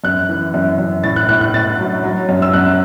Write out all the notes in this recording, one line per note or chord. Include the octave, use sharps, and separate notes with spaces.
F#2 F#6
E3
F#2
F#2
A2 A6
F#6
A2 F#6
F#6
A2 A6
F#3
F#3
F#2
E6
F#2 F#6